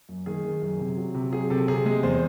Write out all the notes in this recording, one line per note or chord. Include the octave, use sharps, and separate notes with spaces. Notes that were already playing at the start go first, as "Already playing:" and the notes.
F#2
D#3 G#4
D#3
F#2
C3
F#3
C3
F#3 G#4
C3 A4
C3 G#4
G#3 G#4
E2 C5